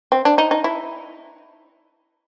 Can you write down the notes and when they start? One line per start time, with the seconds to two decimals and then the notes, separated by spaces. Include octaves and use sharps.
0.12 C4
0.25 D4
0.38 D#4
0.51 D#4
0.64 E4